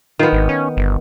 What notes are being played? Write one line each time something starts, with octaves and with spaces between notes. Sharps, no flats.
D#3 B3 F4
G#1
C#4
G1